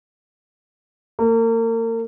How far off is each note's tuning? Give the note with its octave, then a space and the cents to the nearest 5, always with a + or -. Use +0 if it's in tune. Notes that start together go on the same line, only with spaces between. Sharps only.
A#3 -35